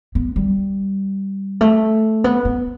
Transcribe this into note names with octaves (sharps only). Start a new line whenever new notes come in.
B3
G3
A3
B3
B3